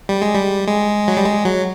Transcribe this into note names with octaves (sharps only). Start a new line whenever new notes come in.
G3
G#3
G3
G#3
F#3
G3
G#3
F#3